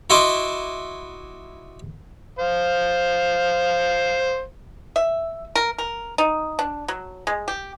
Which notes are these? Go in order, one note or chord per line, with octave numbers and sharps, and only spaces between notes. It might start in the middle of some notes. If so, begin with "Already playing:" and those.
E4 F#4 D#5 E5 C6 D6
C5 F5
E5
A#4
A#4
D#4
D4
F#3
G#3
G4